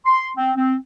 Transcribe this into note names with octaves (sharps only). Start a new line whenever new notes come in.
C6
C4
C4